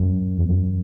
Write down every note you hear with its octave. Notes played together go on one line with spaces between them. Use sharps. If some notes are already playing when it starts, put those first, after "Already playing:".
Already playing: F#2
E2
F#2